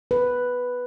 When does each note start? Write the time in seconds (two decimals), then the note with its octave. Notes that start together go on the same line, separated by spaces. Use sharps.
0.11 B4